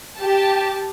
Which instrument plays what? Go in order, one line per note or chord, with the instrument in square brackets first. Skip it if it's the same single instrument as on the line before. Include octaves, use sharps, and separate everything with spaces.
[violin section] G4 A5